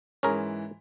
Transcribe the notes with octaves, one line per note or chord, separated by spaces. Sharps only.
G#2 E3 C#4 G#4 A#4